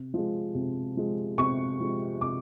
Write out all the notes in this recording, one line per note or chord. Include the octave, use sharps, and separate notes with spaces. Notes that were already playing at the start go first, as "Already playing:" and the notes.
Already playing: C3
F3 G#3
C3
F3 G#3
C3 C#6
F3 G#3
C3 D6